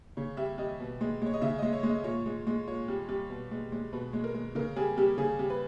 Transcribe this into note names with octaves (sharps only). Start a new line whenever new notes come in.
C#3 C#5
G3 E5
G3 D#5
B2
G#3
G#3 C#5
D#5
C#3 E5
G#3 D#5
C#5
G#3
D#5
A#2 C#5
G#3
G#3
A#2 C#5
G3
G3
B2
G#3
G#3
B2 B4
G#3
A#4
G#3
C#3 A#4
G3 G#4
G3 G4
C#3 G#4
G3
B4